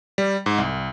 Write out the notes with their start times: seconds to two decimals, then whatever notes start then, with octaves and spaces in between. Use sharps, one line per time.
0.18 G3
0.46 G#2
0.58 C2